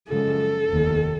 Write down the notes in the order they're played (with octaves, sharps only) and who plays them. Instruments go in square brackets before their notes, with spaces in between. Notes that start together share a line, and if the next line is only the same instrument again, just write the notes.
[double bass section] F#2 C#3 F3 G#3 [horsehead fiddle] A4
[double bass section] F1 D#2 D#3